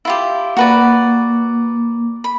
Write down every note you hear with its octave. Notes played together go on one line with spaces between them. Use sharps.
E4 F4 G4
A#3 F#4 B4 D5
B5